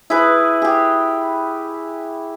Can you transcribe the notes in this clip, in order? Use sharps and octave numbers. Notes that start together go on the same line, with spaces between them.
E4 G#4 B4
G4 G#4